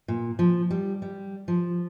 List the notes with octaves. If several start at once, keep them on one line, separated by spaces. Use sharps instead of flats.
A#2
F3
G3
G3
F3